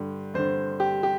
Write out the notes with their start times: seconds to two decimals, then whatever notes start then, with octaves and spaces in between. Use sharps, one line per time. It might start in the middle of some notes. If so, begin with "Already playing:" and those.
Already playing: G2 D3
0.34 G2 D3 C5
0.80 G4
1.03 G4